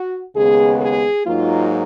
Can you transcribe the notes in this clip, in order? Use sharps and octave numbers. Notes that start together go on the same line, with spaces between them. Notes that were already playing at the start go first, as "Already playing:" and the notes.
Already playing: F#4
D#2 C#3 G#3 B3 G#4
G#4
G#2 F#3 A#3 D#4 F4